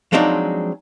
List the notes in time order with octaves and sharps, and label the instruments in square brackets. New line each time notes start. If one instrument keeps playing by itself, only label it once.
[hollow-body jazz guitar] F3 F#3 G#3 C4 D4 D#4